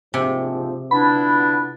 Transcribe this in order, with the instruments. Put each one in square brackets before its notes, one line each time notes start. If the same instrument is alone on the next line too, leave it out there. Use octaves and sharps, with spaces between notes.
[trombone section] A#1 G#2 F3 [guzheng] C3
[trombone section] D3 F4 B4 [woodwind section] B3 D4 E4 [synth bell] B5